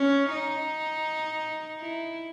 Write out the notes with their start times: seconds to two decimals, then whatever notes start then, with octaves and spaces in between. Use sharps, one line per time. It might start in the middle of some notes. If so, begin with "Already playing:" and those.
Already playing: C#4
0.30 D#4
1.80 E4